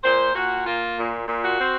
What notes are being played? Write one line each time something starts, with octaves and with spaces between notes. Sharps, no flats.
A#2 C5
A#2 F#4
A#3 F4
A#2
A#2
F#4
C4